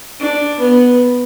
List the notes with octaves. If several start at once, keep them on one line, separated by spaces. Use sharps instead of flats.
D4
B3